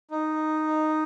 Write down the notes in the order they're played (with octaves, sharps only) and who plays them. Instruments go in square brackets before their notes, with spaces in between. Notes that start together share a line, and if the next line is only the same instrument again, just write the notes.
[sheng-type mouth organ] D#4